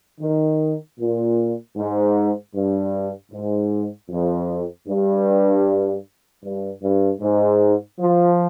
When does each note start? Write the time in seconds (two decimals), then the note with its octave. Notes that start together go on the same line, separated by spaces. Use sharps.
0.20 D#3
0.99 A#2
1.76 G#2
2.54 G2
3.31 G#2
4.09 F2
4.87 G2
6.43 G2
6.82 G2
7.20 G#2
7.99 F3